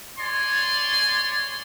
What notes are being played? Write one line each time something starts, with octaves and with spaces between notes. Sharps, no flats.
C#5 D5 G#5 C6